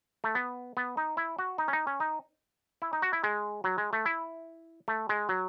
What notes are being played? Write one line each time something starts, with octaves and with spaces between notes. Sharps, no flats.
A3
B3
B3
D#4
E4
F#4
D#4
C#4
D#4
C#4
D#4
E4
D#4
F#4
E4
G#3
F#3
G#3
A3
E4
A3
G#3
F#3